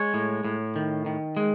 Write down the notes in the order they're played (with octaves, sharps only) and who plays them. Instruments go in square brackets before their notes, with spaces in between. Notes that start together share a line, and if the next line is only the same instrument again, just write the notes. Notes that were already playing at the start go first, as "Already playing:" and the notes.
Already playing: [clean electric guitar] G#3 C#5
A2
A2
D#3
D#3
G#3